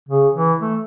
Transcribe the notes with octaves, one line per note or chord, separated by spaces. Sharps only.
C#3
E3
A3